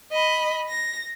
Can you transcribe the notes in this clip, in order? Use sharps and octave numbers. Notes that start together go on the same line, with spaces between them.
D#5 B5
A#6